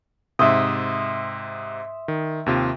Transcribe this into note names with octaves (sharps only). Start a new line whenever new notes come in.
G#2 C3 E5 C6 D#6
D#3
D#2 C3 F4